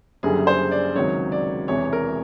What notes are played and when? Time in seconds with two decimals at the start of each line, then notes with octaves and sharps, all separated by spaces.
0.23 F#1 F#2 D3 G3 G#4
0.47 C5
0.71 D5
0.96 C#2 C3 D#3 F#3 C#5
1.32 D5
1.68 E1 E2 C3 E3 C#5
1.93 A#4